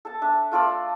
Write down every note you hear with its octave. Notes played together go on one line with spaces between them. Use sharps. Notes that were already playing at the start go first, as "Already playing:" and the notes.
A4 A5
D4 E5
A3 F4 A4 D5